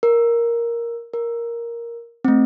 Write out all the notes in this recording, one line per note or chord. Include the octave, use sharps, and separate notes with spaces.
A#4
A#4
A3 C4